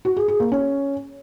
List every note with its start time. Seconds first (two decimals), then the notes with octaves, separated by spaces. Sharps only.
0.05 F#4
0.17 G#4
0.28 G#4
0.40 A#3
0.52 C#4